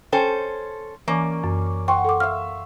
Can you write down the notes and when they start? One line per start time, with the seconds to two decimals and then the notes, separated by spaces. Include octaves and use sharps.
0.13 C#4 A4 C5 G5 G#5
1.08 E3 A#3 C#4 D5
1.44 F#2
1.88 F#5 G5 C6 C#6
2.05 A4 D6
2.20 E5 F5 F6